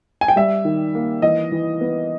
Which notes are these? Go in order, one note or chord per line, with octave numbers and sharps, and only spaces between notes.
G#5
G5
G3 E5
D#3
A#3
E3 D#5
E3
B3